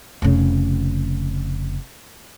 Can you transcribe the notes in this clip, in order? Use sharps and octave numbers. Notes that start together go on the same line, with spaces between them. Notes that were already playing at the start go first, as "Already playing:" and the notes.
F1 C#3